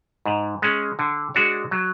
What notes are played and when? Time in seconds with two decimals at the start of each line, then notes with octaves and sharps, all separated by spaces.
0.26 G#2
0.62 G#3 C#4
0.99 D3
1.35 G#3 D4 F#4 C#5
1.71 F#3